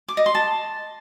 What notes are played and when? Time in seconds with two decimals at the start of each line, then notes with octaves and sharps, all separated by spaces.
0.08 D6
0.17 D#5
0.26 C6
0.35 A5